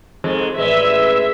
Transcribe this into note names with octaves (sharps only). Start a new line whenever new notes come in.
F2 G#2 G#3
A1 G#3 B4 D5 E5